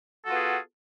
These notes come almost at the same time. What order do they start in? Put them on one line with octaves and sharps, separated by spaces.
A4 F#4 F4 B3 G#4